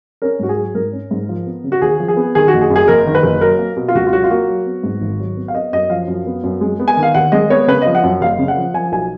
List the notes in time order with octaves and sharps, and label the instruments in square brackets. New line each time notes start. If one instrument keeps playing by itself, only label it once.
[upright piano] C#4 A#4
G#2 F#4
G#4
F#3
G#2 A#4
C#4
G#2
F3
B3
C#3
F#4
D#2 G#4
F3
G#4
B3
D#3 G#4
F#4
F#1
G#4
F#2
G#4
F#1 A#4
D#3
B4
F#1
F#3 A#4
A#3
B2
F4
C#2 F#4
F4
F#3 F#4
F4
A#3 F#4
F#3
B3
G#2
G#1
F#3
B3
F5
B3 D#5
F#2 D#5
F3 F5
F#2
B3
F#2
G#3
B3
G#5
D#3
F5
D#2 F#5
G#3 D#5
B3 C#5
C#3 B4
F3 D#5
F#5
F#2
F#1 F5
C#3
F#5
F3
F3 G#5
B1 G#5